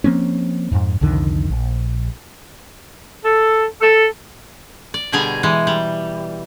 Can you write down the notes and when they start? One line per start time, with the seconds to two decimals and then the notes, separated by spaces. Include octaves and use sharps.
0.04 F3 A#3 C4 C#4
0.72 F2 G#2
1.01 C2 F2 D3 D#3
1.50 A#1
3.24 A4
3.81 A4
4.94 D5
5.12 B2 D3 G3 G#4 G#5 A#5
5.43 E3 G#3
5.67 G3